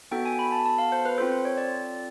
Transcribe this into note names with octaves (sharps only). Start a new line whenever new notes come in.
B3 D#4 F#4 A4 G5
G#5
B5
A5
A5
F5
C5
B4
C4 F4 A4 C5
C5
C#5
D5